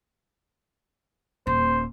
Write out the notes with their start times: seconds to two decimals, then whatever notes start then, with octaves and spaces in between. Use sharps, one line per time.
1.47 D#1 C5